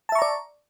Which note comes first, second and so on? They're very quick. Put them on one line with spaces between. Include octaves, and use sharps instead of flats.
A5 E5 C#6 A#5 D5